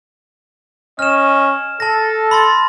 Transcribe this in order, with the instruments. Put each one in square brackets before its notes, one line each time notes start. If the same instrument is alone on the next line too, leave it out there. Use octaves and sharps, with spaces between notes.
[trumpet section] C#4 D#5 [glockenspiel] F6 E7
[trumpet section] A4 [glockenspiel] A5 A#6
[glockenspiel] B5 C6 A6